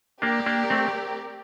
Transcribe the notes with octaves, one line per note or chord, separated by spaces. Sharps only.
A#3 D4 G4 A#4 D5
A#3 D4
A3 C4